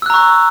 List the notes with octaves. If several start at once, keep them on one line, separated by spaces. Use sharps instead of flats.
A#5 C#6 E6 F#6